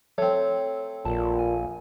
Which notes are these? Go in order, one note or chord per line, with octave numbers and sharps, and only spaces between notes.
A3 C4 C#5
A#1 A#2 A5
G#5